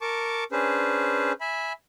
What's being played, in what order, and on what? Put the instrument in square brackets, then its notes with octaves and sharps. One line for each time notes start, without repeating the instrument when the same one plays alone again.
[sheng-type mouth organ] A#4 A5 C#6 D6
C#4 D4 G#4 B4 C5
E5 G#5 B5